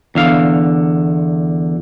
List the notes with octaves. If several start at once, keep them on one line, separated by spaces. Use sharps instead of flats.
E2 D3 F5